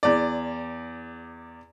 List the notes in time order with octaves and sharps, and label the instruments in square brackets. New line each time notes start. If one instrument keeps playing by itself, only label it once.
[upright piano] E2 D5